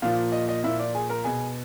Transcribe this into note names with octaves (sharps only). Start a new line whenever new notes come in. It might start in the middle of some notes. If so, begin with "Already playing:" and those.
A#2 F3 F4 F5
D#5
D#5
A#2 F3 E4 E5
D5
G#4 G#5
A#4 A#5
B2 G#4 G#5